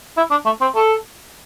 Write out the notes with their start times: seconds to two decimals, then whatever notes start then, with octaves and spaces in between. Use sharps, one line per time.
0.17 E4
0.31 D4
0.45 A3
0.61 C4
0.76 A4